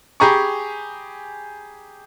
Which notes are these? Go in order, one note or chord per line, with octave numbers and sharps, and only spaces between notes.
G4 G#4 G#5 A#5 B5 C#6